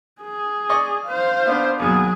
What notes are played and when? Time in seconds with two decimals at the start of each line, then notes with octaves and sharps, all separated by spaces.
0.21 G#4
0.69 D5 D#5 C#6
1.06 C5 F5
1.46 B3 D4
1.80 D#2 B2 F#3 G#4